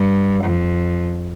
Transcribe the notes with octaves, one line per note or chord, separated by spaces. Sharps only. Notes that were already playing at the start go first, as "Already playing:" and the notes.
Already playing: G2
F2